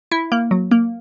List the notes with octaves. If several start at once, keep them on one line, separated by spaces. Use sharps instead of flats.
E4
A#3
F#3
A#3